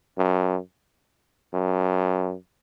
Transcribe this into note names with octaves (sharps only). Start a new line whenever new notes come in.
F#2
F#2